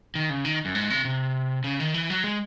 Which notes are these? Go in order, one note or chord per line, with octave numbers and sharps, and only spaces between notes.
D#3
C#3
D#3
F#2
G#2
C3
C3
C#3
D#3
E3
F#3
G#3